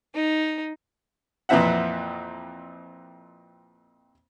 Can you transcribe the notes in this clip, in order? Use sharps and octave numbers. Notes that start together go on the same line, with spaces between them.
D#4
F2 A#2 E3 C4 E5 F#5